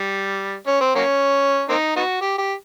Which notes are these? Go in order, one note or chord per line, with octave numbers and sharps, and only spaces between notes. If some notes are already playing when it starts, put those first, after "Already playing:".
Already playing: G3
C#4
C4
F#3 A#3 C#4
A#3 C4 D#4
B3 D#4 F#4
G4
G4